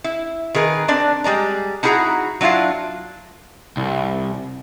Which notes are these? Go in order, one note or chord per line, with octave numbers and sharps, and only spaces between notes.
E4
D#3 G#4 A#4 B4
C4 D4 D5
G3 G#3 D5 A#5
D#4 E4 F#4 G#4 F#5 A#5
F#3 D4 E4 F4 F5
C2